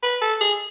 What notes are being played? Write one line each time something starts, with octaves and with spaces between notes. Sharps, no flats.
B4
A4
G#4